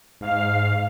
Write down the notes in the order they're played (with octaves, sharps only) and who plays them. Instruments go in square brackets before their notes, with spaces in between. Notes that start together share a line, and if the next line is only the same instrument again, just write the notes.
[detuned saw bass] G#2 [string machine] F5